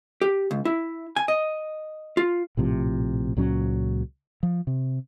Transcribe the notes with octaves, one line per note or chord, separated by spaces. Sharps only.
G4
C#2
E4
G#5
D#5
F4
A#1 A2 C3 F3
C#2 A#2 F#3 C#4
F3
C3